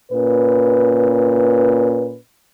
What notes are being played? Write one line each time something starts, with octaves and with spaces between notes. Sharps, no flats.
A#2 C#4 B4